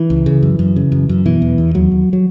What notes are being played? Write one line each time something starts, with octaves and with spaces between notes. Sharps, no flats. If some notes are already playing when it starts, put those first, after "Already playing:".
Already playing: E3
C#2
C#3
F#2
F#2
C#3
F#2
F#2
B2 E3
E2
E2
D#2 F#3
D#2
F#3